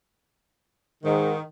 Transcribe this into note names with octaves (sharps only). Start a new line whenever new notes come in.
G#2 D#3